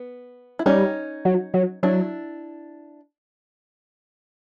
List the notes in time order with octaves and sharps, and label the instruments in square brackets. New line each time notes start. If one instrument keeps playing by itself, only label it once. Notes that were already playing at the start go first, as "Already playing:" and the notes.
Already playing: [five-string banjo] B3
E4
[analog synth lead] G3 [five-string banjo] C#4 D#4
[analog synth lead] F#3
F#3
[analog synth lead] F#3 [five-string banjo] D4 E4